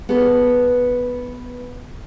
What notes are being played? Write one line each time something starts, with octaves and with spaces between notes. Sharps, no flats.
B3 G#4 A4